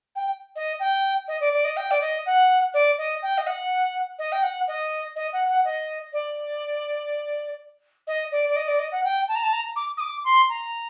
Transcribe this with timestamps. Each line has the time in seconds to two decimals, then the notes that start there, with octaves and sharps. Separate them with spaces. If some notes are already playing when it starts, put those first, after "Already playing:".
0.16 G5
0.56 D#5
0.79 G5
1.28 D#5
1.40 D5
1.53 D5
1.65 D#5
1.77 G5
1.91 D5
2.01 D#5
2.26 F#5
2.74 D5
2.98 D#5
3.22 G5
3.38 D#5
3.47 F#5
4.19 D#5
4.32 G5
4.43 F#5
4.67 D#5
5.16 D#5
5.33 F#5
5.49 F#5
5.65 D#5
6.13 D5
8.07 D#5
8.31 D5
8.49 D5
8.56 D#5
8.68 D5
8.79 D#5
8.92 F#5
9.04 G5
9.28 A5
9.35 A#5
9.43 A5
9.53 A#5
9.76 D6
9.97 D#6
10.00 D6
10.25 C6
10.49 A#5